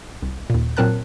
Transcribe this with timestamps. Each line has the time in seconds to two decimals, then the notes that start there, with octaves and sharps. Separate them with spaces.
0.22 C2
0.50 D#2 A#2
0.77 A#2 F#3 C4 A#4 A5 F#6